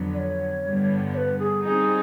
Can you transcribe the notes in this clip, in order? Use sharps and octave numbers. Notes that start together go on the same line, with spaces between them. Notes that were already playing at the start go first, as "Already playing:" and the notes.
Already playing: F2 D3 F#3 B3
D5
C#5
G2 D3 G3 B3
C#5
B4
G#4
G3 C4 D#4 G#4